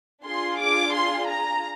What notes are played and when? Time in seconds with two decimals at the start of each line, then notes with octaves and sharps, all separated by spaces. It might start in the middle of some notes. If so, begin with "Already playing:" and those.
0.24 D4 F4 G#4 C6
0.59 D6
0.94 C6
1.28 A#5